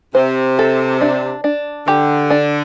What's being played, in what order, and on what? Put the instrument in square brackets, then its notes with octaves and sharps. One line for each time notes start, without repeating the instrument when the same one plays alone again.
[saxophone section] C3 [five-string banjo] C5
[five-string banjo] A4
D4
D4
[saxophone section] D3 [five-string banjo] G4
[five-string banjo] D4